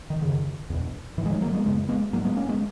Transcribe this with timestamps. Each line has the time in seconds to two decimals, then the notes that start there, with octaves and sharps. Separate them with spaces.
0.10 D#3
0.22 F#2 C#3
0.70 E2 B2
1.18 G#2 E3
1.26 G#3
1.30 D#3 F#3
1.41 F#3 A#3
1.54 G#3 B3
1.65 F#2 C#3 G#3 B3
1.89 G#3 B3
2.13 G#2 F#3 A#3
2.25 G#3 B3
2.36 A#3 C#4
2.49 G#3 B3